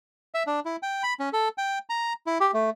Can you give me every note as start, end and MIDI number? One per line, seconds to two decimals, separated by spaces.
0.34 0.43 76
0.47 0.60 62
0.65 0.76 64
0.83 1.03 79
1.03 1.14 83
1.20 1.29 61
1.33 1.48 69
1.58 1.79 79
1.90 2.13 82
2.27 2.38 64
2.40 2.51 67
2.54 2.70 57